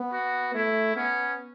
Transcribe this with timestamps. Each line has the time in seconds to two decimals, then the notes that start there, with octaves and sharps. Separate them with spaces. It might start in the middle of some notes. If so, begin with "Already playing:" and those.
Already playing: B3
0.13 F#4
0.55 A3 E4
0.96 B3 C#4